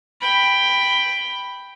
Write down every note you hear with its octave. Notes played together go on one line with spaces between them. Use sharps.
G5 B5